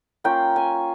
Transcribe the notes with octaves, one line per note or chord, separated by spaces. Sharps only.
A#3 C#4 F4 G5
G#5